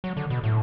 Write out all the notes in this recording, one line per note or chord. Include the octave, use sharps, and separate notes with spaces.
F#3
D3
B2
A2